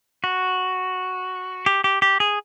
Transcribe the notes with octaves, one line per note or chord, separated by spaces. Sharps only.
F#4
G4
G4
G4
G#4